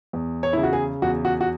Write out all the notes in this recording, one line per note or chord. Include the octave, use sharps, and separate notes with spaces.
E2
C#5
C#3 E4
F#4
G#4
E2 F#4
F#4
F#4